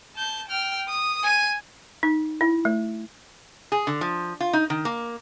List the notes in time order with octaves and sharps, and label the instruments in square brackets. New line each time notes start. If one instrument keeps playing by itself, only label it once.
[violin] A5 G6
G5 F6
D#6
G#5 D#7
[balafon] D#4
E4
A3
[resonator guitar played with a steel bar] G#4
D3
F3
F4
D#4
D#3
A#3